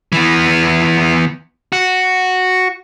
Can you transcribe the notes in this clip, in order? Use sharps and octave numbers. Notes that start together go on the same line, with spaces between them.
E3 B3
F#4